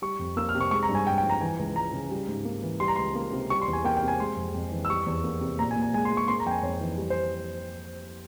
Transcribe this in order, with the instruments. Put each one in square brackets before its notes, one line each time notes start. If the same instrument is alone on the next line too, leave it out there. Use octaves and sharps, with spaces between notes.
[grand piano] G3 C#6
F2
A#3 E6
F6
C3
C#6
G#3 C#6
A#5
G2
G#5
G2 G5
G5
F3
A#5
E3 G#5
C#2
C#2 A#5
C#3
G3
G#2
A#3
E3
G3 C6
A#5
C#2 C6
A#3
C3
G3 C#6
C6
E2
G#5
A#3 G5
G5
C3
G#5
G#3 C6
F2
F2
E3
E6
G3 C#6
E2
A#3
C3
A#2 A#5
G#5
A#2
G#5
G#3 G#5
C6
G#3
C#6
A#3 C6
A#5
F2 G5
G#5
F2 C#5
E3
G3
C5